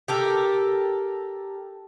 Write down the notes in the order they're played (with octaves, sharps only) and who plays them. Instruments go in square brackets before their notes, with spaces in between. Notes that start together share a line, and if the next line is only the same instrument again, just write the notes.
[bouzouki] G4 A4 A#4